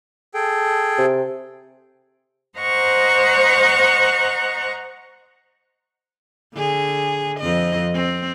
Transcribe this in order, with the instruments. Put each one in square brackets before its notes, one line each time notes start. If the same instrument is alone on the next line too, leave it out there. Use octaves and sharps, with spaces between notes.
[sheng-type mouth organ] G#4 A4 G5
[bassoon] C3
[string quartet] C5 D#5 F#5 A#5 C#6
[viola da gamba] D3 G#4
F2 C4 D#5
C4